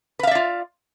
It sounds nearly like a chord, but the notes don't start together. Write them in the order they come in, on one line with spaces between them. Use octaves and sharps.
B4 F5 E5 D5 F4